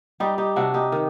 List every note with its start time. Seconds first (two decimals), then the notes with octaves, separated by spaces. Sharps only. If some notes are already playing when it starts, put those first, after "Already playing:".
0.20 G3 D#4 G4
0.38 D#4 G4
0.56 C3 D4 F#4
0.74 D#4 G4
0.92 D#3